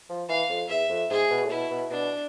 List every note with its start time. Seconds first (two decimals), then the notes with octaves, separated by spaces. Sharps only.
0.10 F3
0.29 E3 F5
0.49 F2
0.69 E2 E5
0.89 F2
1.10 G#2 G#4
1.30 B2
1.44 A2
1.50 B2 E4
1.71 B2
1.91 B2 D4